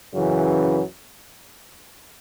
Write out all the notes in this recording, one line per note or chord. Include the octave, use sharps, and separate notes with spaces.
F#2 C#3 E3